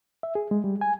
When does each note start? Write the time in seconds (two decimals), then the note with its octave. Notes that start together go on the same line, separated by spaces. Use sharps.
0.23 E5
0.35 G#4
0.51 G#3
0.64 G3
0.81 G#5